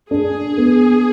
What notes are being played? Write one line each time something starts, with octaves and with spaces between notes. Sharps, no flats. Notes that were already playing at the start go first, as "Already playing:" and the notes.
D4 G#4
B3